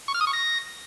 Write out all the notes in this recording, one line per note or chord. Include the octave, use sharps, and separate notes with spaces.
C#6
F6
D#6
C#6
A#6